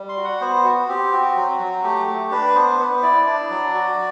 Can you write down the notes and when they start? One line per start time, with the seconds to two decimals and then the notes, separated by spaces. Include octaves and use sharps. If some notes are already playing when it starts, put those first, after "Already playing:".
Already playing: G3
0.09 C6
0.17 F#4
0.25 F#5
0.41 B3 C5
0.65 F#4
0.88 C4 G4
1.12 F#4
1.36 F#3
1.60 F#3
1.83 A3 G4
2.07 A3
2.31 D4 B4
2.55 B3 C5
2.79 B3 B4
2.97 C5
3.02 E4 D5
3.26 D4 D5
3.50 F#3
3.74 F#4